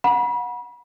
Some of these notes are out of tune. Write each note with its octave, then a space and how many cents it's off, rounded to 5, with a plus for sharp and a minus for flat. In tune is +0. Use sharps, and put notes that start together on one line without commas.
F#5 -20 B5 -35